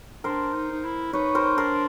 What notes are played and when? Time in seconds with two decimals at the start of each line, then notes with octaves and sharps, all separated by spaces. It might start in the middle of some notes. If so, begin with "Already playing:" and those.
0.24 D4 A#4 C5
0.54 D#4
0.71 D#4
0.84 E4
1.13 D#4 B4 C#5
1.35 A#4 C5
1.57 D4 A#4 C5